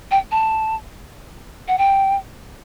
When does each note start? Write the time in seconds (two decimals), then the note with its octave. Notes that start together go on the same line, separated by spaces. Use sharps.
0.11 G5
0.32 A5
1.68 F#5
1.78 G5